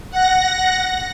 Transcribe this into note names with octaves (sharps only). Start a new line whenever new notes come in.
F#5 A#6